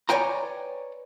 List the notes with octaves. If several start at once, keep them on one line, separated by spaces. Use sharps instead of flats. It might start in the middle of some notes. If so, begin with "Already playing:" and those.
B4 C#5 D5 G5 G#5 A#5